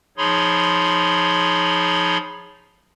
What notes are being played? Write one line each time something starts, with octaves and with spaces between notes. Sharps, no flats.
F3 D#4 G#4 C#5 B5 C6